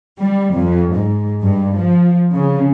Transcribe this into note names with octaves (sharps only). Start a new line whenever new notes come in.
G3
F2
G#2
G2
F3
C#3